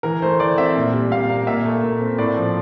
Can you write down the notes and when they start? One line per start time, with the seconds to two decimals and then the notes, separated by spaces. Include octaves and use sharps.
0.03 E3 A#4
0.22 A3 C5
0.40 E3 D5
0.57 C4 E5
0.76 A#2
0.93 G3
1.11 A#2 F5
1.29 A#3
1.47 A#2 E5
1.65 A3
1.83 A#2
2.01 C4
2.18 A2 D5
2.37 F3